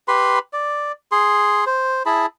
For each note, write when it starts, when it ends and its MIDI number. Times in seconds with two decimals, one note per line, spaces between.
0.08 0.39 67
0.08 0.39 71
0.08 0.39 83
0.08 0.39 84
0.53 0.92 74
1.12 1.65 68
1.12 1.65 84
1.66 2.03 72
2.06 2.26 64
2.06 2.26 68
2.06 2.26 81
2.06 2.26 83